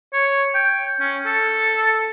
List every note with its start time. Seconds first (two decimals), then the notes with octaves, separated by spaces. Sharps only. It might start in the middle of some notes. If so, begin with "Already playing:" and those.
0.13 C#5
0.55 G5
1.00 C#4
1.26 A4